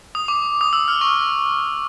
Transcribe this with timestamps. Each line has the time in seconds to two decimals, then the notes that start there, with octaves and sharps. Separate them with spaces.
0.15 D#6
0.28 D6
0.61 D#6
0.73 E6
0.88 F6
1.01 C#6